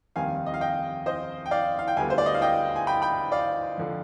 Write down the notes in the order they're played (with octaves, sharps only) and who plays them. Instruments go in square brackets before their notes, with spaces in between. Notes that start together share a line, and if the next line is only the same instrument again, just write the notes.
[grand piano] F1 D#2 D#3 G3 C4 F5 G#5
D#5
F5
D#5 G5
C5 D#5
G5
D5 F5
F5
G5
D2 D3 G3 B3 F5 G#5
C5
D5
D#5
F5
D#5 G5
G#5
G5 B5
G5 B5
D5 F5
F2 D3 F3